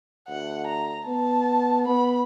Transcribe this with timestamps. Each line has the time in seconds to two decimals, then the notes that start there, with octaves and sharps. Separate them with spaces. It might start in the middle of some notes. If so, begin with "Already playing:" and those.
0.29 D2 F#5
0.67 A#5
1.07 B3 A5
1.88 B3 B5